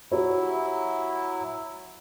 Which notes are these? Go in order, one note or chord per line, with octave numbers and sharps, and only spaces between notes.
F#3 E4 F#4 G4 C#5